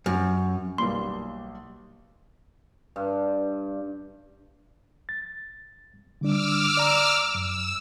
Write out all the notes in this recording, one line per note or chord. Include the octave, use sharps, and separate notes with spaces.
F#2
B1 G3 A#3 C6
G2
A6
D3 G3 D4 D6 E6 F6
D5 A#5
F#2 E6